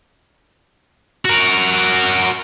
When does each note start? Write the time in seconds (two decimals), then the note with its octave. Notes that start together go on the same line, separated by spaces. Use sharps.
1.25 F#4 A#4